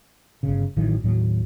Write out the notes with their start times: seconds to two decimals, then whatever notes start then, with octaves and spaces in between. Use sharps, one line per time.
0.43 G1 C#3
0.77 A1 D#3 E3 F#3
1.04 D#2 A2 F#3